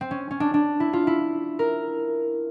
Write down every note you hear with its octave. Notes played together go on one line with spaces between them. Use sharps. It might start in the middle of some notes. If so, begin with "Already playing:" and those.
C4
C#4
C#4
D4
D4
E4
F4
E4
A#4